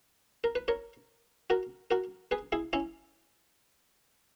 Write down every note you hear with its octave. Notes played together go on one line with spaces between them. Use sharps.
A#4
B4
A#4 C#5
F#4 A#4
F#4 A#4
G#4 B4
E4 G#4
C#4 E4